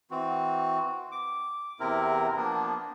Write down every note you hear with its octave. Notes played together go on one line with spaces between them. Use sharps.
E3 C4 F#4
D6
E2 C3 C4 E4 A#4
F3 A#3 B3 D4